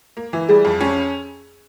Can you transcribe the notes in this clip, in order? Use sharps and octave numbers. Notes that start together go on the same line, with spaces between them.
A#3
E3
G3 G#4
F2
C#4